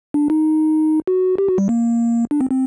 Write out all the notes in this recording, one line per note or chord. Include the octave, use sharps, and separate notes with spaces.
D4
D#4
F#4
G4
F#4
G3
A#3
D4
C4
C4